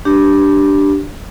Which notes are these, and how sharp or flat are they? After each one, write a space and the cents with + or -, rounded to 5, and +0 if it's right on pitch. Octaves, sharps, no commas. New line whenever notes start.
D4 +0 G4 -10